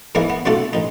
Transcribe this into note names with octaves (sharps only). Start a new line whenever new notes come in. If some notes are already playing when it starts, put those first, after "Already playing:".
E2 G#2 E3 A#3 E4 G#4
B3
B1 C#3 A3 D4 F4 A4
A1 D#4